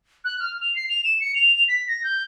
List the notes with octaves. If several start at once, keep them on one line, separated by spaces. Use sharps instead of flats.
F#6
F6
F7
C7
F7
E7
C#7
F7
F7
B6
A#6
G6